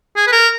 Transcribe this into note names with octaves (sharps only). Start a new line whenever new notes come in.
G#4
B4
A#4